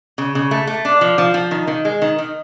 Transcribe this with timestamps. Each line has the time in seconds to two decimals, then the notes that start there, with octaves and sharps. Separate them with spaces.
0.18 C#3
0.35 C#3
0.51 A3
0.67 A3
0.85 D4
1.01 F3
1.18 F3
1.34 F3
1.51 D#3
1.67 D#3
1.85 G#3
2.02 D#3
2.18 D#3